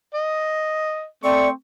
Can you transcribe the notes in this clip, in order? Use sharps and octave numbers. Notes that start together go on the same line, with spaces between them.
D#5
A3 C4 D5 C#6